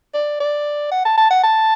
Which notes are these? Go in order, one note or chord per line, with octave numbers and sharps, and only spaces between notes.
D5
D5
F#5
A5
A5
F#5
A5